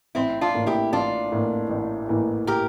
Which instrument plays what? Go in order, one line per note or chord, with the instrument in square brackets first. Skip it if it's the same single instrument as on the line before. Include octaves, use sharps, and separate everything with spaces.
[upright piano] A1 [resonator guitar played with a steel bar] C4 E4
[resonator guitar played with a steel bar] D4 F4
[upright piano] A2 E3 A#3
[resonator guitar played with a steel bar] E4 G4
[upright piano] A1 [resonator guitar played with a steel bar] D4 F4
[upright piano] A2 E3 A#3
A1
A2 E3 A#3
[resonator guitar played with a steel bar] G4 A#4